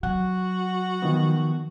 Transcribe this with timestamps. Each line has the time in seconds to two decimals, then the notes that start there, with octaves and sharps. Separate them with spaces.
0.03 F#3 F#4 F#5
1.02 D#3 F3 B3